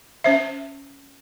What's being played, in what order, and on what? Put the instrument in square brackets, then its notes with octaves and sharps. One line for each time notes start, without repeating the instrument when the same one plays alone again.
[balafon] C#4 C5 E5